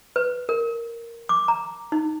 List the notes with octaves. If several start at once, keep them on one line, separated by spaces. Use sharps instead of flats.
B4
A#4
D6
A#5
D#4